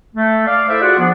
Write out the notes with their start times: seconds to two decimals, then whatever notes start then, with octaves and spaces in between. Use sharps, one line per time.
0.15 A3
0.47 D5 F5
0.69 E4 A4 C5 D5 E5
0.82 F4 F#4 G#4 D5 F#5
0.98 F3 B3 D4